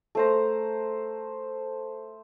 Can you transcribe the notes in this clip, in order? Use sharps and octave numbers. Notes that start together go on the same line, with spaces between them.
A3 C5 A#5